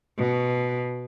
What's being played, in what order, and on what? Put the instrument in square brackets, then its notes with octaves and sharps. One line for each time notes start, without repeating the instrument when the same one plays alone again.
[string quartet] B2